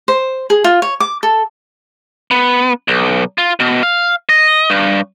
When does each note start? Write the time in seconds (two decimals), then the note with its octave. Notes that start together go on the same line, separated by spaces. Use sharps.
0.08 C5
0.50 G#4
0.64 F4
0.82 C#5
1.00 D6
1.23 A4
2.31 B3
2.88 B1
3.38 F4
3.60 B2
3.83 F5
4.29 D#5
4.70 G2